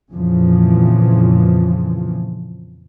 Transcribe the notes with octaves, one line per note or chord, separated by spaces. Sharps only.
F2 A#2 C#3 E3 F3